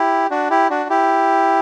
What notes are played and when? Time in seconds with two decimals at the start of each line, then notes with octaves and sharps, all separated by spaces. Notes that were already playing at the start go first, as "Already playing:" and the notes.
Already playing: E4 G4
0.31 D4 F#4
0.50 E4 G4
0.70 D4 F#4
0.90 E4 G4